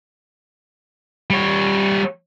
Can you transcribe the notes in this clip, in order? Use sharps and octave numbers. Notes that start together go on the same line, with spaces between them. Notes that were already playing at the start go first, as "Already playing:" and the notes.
G3 C#5